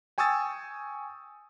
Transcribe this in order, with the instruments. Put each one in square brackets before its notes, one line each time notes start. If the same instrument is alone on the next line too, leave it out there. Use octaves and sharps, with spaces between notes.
[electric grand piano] G5 G#5 C#6 D#6 E6 A6